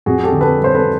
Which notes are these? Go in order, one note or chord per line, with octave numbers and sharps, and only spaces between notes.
F2 F#4 G#4
G4 A4
D3
A4 B4
G3
C5
A4 B4